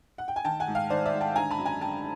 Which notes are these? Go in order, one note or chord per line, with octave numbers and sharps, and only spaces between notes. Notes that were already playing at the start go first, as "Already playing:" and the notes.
F#5
G5
G#5
D#3 G5 A5
F#5 G#5
G#2
F5 G5
D#3 C5 D5
D5 E5
G#2
G5 A5
D3 G#5 A#5
A5 B5
F#2
G#5 A#5
D3 G5 A5